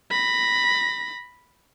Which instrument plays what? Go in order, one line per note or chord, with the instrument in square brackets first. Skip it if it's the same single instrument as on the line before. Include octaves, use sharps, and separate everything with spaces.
[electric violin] B5 A#6